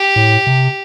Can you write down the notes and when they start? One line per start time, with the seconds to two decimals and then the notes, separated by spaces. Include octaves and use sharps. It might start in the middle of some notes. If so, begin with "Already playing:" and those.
Already playing: G4
0.16 A2
0.47 C3